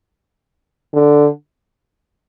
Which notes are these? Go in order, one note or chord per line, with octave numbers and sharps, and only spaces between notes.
D3